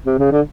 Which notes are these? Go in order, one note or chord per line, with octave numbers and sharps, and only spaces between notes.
C3
C#3
D3